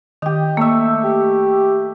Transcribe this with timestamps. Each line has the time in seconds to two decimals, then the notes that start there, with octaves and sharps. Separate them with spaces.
0.22 D#3 G4 D#5
0.57 A3 A#3 E5
1.04 G4